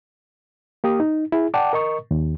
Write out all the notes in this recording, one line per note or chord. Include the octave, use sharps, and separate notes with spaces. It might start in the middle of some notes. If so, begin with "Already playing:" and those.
A#3 G4 D#6
D#4
E4 G#4
D5 F#5 G5 A5 D6
A#4 D#5 C#6
D#2